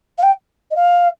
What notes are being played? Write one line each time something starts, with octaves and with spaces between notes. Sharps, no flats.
F5
G5
D#5
F5